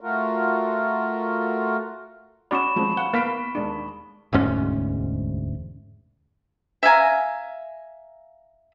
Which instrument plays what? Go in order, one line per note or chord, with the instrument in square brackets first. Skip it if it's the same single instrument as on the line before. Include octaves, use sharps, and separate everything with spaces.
[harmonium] A3 F4 F#4 A#4
[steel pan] C#4 F#4 D5 [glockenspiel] B5 C#6 E7
[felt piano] F3 G#3 C4
[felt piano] F5 [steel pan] F#5 [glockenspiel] G7
[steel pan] A#3 B4 F5 [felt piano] B3 B6 D7
[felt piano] D#2 G#3 [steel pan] D4
[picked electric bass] E1 D2 G#2 C#4
[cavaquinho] E5 F5 G#5 A#5